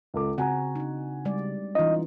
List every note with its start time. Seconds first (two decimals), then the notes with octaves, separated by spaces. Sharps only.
0.14 C#2 A4 D6
0.38 C#3 C4 F#4 F#5 G#5 A#5
0.76 D4 D#4
1.25 G3 G#3 D5
1.75 E3 C#4 D#4 F4 D#5